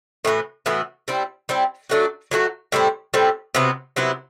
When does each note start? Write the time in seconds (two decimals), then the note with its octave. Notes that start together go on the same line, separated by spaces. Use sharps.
0.25 A2 E3 B3 F#4
0.66 A2 E3 B3 F#4
1.08 G3 C4 E4
1.49 G3 C4 E4
1.89 F#3 A3 D4 F#4
2.31 F#3 A3 D4 F#4
2.72 A2 G3 C4 E4
3.14 A2 G3 C4 E4
3.55 C3 F#3 B3 E4
3.96 C3 F#3 B3 E4